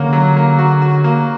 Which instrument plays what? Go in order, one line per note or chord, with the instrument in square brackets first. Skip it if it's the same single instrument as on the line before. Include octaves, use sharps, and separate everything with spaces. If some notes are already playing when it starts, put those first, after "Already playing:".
Already playing: [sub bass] D3 [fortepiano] A#3 C#4 F#4
[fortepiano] F#3
A#3
F#4
F#4
A#3